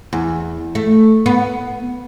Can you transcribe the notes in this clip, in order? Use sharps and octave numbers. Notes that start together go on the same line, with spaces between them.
E2
A3
B3